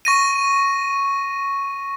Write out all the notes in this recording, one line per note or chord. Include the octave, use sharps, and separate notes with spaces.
C#6 A#6 D#7